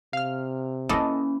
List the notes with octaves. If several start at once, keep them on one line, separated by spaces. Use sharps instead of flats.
C3 F5 F6
E3 A#3 C#4 A4 D#5 A5